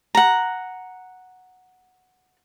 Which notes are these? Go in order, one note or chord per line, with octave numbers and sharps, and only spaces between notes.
F#5 A#5